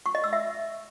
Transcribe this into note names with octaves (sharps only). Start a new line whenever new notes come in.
C#6
D#5
E6
E5